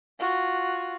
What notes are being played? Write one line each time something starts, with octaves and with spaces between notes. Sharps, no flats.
F4 F#4